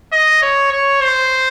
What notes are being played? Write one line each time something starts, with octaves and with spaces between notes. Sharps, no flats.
D#5
C#5
C#5
C5